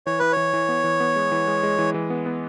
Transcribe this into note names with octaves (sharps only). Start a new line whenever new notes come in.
E3 C#5
E3 B4
E3 C#5
E3
B3
E3
B3
G#3
E3
G#3
G#3
E3
E3
B3
B3